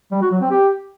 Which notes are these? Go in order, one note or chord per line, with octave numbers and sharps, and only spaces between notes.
G3
F#4
F#3
C4
G4